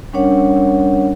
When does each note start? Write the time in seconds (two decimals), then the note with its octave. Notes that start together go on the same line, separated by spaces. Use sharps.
0.13 G3 C#4 D4 A#4 C#5 F#5